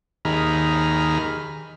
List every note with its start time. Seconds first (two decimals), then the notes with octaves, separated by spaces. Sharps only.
0.25 D#2 D#3 G#4 A#5 B5 F6